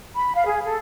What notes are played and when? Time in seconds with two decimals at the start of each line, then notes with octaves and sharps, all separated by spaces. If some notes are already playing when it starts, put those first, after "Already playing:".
0.15 B5
0.34 F5
0.46 G#4
0.66 A4